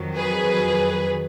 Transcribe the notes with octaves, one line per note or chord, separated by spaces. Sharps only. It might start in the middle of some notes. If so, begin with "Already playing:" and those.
Already playing: F2 D#3 F#3
G#4 B4